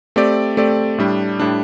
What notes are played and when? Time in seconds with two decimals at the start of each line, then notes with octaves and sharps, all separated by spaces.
0.16 A3 C4 G4 D5
0.57 A3 C4 G4 D5
0.98 A2 G3 D4
1.40 A2 G3 D4